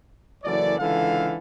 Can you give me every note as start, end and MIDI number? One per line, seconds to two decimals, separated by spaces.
0.44 0.77 30
0.44 0.77 42
0.44 0.77 52
0.44 0.77 69
0.44 0.77 74
0.78 1.37 37
0.78 1.37 50
0.78 1.37 52
0.78 1.37 69
0.78 1.37 77